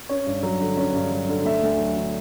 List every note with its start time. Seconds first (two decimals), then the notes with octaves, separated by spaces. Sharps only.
0.09 C#4 C#5
0.27 G2
0.43 F#3
0.61 D3
0.77 C#4
0.94 G2
1.11 F#3
1.29 D3
1.45 A3 E5
1.63 D2
1.79 F#3
1.97 D3